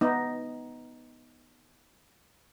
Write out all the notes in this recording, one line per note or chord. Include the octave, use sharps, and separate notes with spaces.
B3 D#4